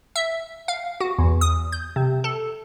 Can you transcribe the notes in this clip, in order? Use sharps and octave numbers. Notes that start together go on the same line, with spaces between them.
E5
F5
F#4
E2
D#6
G6
C3
A4